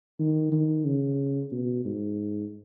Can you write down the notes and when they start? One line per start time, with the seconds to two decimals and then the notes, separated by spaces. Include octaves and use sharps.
0.19 D#3
0.52 D#3
0.85 C#3
1.52 B2
1.85 G#2